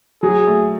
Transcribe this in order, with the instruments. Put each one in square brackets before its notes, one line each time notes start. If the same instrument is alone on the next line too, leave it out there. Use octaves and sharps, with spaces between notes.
[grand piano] F#3 [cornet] G#4
[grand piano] A3